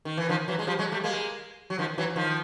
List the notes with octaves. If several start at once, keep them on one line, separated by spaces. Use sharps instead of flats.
D#3
E3
D#3 F3
E3 F#3
G#3
F3 G3
F#3 G#3
G3 A3
G#3 A#3
F#3
D#3 F3
E3 F#3
D#3 F3